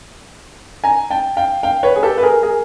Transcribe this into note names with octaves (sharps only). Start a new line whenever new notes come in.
G#5 A#5
G5 A5
F5 G5
F5 G5
B4 C#5
G#4
G4 A4
B4
G#4 A#4
G#4 A#4